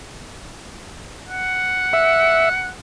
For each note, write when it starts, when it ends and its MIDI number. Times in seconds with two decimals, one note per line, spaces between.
1.29 2.74 78
1.93 2.49 76